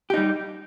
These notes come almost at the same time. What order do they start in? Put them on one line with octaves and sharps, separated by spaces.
G4 D#4 G3